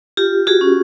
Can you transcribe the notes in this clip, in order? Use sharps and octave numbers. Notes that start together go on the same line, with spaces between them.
F4 G4
F#4 G#4
C#4